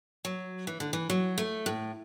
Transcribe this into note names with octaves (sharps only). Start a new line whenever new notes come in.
F#3
E3
D3
E3
F#3
A3
A2